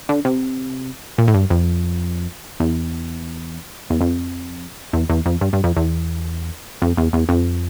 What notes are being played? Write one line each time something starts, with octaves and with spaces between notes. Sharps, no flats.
D3
C3
A#2
A2
G2
F2
E2
E2
F2
E2
E2
F2
G2
G2
F2
E2
F2
E2
E2
F2